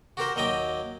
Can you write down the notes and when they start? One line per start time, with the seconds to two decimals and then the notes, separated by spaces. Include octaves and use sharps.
0.17 F#4 G4 A#4 C5
0.36 D#2 F#3 D#5 G5 D6